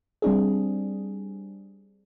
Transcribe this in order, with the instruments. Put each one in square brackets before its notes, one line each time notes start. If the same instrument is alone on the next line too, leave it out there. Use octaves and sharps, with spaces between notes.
[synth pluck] G3 C4 D4 G#4